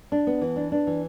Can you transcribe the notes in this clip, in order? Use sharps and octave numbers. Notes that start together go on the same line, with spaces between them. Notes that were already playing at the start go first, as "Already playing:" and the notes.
D4
B3
E3
D4
D4
E3